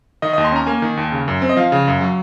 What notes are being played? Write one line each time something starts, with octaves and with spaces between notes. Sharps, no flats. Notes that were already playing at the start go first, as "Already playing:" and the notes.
D#3 D#5
D#2 D#5
C6
C#4 A#5
A#3 G#5
D#3
D#2
C#3
F#2
C4
D#5
F3 F5
C#3
F#2
F#3